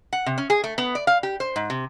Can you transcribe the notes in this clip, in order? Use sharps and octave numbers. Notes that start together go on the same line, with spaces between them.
F#5
C3
C#4
G#4
A3
B3
D5
F5
G4
C5
G#2
C3